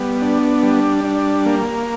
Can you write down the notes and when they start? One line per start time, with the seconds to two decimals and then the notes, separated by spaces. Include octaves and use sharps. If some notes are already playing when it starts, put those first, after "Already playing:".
Already playing: G3 B3
0.22 D4
0.63 G3
1.04 D4
1.46 A#3